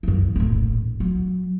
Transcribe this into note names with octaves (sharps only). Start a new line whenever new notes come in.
F#2 E3
D#1 A1
F#3